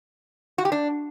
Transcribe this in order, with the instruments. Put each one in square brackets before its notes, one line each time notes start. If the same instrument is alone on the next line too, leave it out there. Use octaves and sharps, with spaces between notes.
[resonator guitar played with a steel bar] F#4
G4
D4